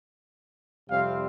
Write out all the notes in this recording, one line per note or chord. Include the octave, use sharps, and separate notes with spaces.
F2 C3 G3 C4 F5